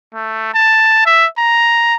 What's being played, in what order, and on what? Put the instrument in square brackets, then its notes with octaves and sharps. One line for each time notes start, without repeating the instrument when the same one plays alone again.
[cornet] A3
A5
E5
A#5